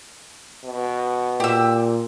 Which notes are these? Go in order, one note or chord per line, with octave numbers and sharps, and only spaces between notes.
B2
A#2 G4 E6